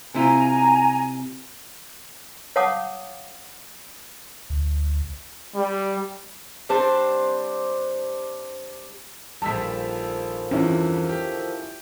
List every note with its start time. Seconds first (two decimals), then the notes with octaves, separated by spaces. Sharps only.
0.14 C3 E4 F4 G#5 A#5
2.56 C#5 F5 F#5 A5 D6 D#6
4.50 D2
5.56 G3
6.69 G3 C4 D4 C5
9.42 A#1 D#3 F3 G3 A4 A5 E6 B6
10.51 E2 G2 C#4 E4 F4
11.09 G4